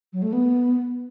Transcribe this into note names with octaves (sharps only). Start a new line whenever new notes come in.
F#3
A3
B3